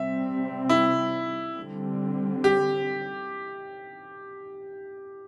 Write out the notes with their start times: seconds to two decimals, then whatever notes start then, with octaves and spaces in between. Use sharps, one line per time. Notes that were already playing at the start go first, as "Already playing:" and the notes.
Already playing: C3 G3 C4 E5
0.69 E4
1.57 D3 G3 C4
2.44 G4